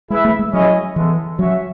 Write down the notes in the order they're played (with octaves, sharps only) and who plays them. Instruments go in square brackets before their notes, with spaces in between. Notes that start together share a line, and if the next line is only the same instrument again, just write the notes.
[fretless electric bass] G#3 [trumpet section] E4 G#4 B4 E5
[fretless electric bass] A3
G#3
[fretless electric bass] F#3 [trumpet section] C#4 E4 G#4 D#5
[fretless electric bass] E3 [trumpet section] G#3 B3 E4 A4
[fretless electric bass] F#3 [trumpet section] C#4 F#4 C#5 E5